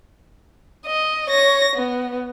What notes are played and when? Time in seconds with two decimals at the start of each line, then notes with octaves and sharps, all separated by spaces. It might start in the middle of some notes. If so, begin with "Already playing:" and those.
0.86 D#5
1.30 C#5 A#6
1.76 B3